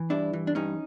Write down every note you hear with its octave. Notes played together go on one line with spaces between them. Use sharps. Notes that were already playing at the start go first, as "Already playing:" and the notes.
Already playing: E3
G2 D4 E4
E3
D4
G2 C#4 D#4